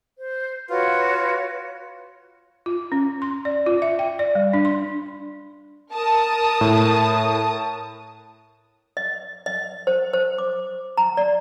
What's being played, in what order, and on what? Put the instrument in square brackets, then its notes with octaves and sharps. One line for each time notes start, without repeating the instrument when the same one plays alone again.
[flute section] C5
[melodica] F4 [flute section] F#4 B4 C#5
[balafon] F4
C#4
C6
D5
F4
E5
G5
D5
G3
D4
C6
[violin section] A#4 A5 D#6
[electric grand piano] A2
[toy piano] D#5
D#5
C5
C5
D6
A#5
D5